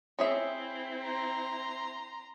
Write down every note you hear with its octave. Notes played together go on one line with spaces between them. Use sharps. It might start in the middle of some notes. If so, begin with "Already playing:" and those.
C4 C#4 E4 G#4 E5
A#5 C6